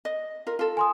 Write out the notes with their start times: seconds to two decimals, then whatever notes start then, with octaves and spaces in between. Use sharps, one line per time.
0.05 D#5
0.47 F4 A#4
0.59 F4 A4
0.77 G#5 C6 D#6